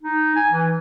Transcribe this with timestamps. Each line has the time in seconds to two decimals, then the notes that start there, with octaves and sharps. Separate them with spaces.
0.03 D#4
0.36 G#5
0.51 E3